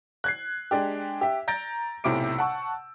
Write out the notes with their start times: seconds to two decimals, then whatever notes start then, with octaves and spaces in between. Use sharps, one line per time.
0.24 F#6 G#6 C7
0.71 G#3 D4 G4
1.21 G4 E5
1.48 A#5 G6 A6 A#6 D7
2.04 B1 A2 C3 E4 D6 D7
2.39 F#5 A5 C#6 E6